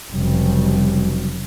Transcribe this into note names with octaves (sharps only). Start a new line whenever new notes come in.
F1 C#3 F#3 G3